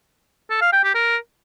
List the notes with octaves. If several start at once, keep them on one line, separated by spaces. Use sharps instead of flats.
A4
F5
G5
G4
A#4